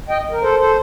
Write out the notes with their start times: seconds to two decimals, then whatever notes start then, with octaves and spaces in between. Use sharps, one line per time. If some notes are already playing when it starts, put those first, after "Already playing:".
0.09 D#5 G5
0.31 A#4
0.42 A4 C5
0.59 A4 C5